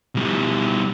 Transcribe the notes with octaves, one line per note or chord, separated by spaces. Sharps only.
B2 G3